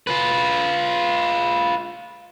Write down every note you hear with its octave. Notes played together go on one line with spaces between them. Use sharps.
F4 B4